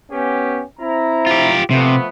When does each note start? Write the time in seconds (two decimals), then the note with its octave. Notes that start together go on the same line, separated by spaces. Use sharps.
0.11 B3 C#4 G4
0.80 C4 E4 A#5
1.27 F4 G4
1.71 C3 F3 A3 B3